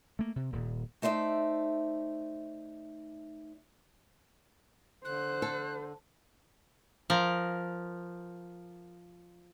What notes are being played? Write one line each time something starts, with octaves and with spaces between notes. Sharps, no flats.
A3 A#3
C3
D#1 A#2
A3 D#4 C5 D5 E5
D3 C5 F#6
A4
F3 A#4